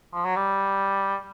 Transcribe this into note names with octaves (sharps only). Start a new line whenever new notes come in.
F3
F#3
G3